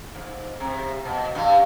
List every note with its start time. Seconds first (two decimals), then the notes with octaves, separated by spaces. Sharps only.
0.15 G#2
0.60 C3
1.05 B2
1.35 G2 G3